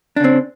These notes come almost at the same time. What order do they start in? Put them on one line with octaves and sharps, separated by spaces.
D4 C#3 C4